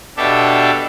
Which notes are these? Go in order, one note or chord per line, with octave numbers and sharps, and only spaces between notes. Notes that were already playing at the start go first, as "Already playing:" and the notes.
B2 D4 G4 A4 E5